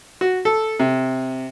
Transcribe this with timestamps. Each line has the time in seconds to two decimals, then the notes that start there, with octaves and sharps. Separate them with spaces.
0.21 F#4
0.45 A4
0.80 C3